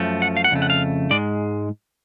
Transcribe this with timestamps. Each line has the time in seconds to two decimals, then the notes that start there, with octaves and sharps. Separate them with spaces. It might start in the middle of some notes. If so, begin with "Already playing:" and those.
Already playing: F#2 F3 A3
0.22 F#5
0.37 F5
0.44 F#5
0.51 F2 C#3 A3
0.62 F#5
0.70 F5
1.11 G#2 G#3 D5